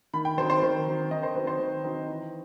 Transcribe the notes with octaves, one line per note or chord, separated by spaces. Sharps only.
D#3 B5
G5
F#3 C4 D#4 C5
C5
D#3 C5
F#3 C4 D#4
D#3 D#5
C5
F#3 C4 D#4 B4
C5
D#3
F#3 C4 D#4
E3